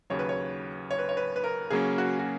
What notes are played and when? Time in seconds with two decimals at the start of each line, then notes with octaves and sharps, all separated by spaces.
0.10 D#2 C#3 F#3 C#5
0.19 B4
0.29 C#5
0.91 C#5
0.99 B4
1.09 C#5
1.17 B4
1.36 B4
1.44 A#4
1.70 C#3 F#3 A#3 C#4 G#4
1.98 F#4
2.19 F#4